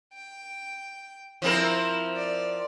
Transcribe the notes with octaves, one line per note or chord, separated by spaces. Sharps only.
G5
F3 C4 E4 A#4
D5